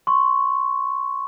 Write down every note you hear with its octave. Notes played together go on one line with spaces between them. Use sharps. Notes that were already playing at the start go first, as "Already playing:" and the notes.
C6 C#6